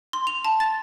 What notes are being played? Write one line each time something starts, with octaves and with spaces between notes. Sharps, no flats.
C6
F7
A5
A6